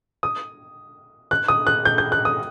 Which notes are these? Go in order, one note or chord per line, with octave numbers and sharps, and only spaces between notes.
D#6
F#6
D#6
F#6
G6
G6
F#6
D#6